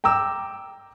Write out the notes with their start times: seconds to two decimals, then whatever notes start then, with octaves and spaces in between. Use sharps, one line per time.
0.04 G5 A#5 D6 E6